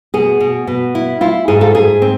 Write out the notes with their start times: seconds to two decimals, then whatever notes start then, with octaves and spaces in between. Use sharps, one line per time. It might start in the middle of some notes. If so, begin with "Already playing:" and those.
0.14 B2 G#4
0.40 B2
0.67 B2
0.95 E4
1.21 E4 F4
1.48 G#2 G#4
1.61 F4 A4
1.75 G#2 G#4
2.02 C4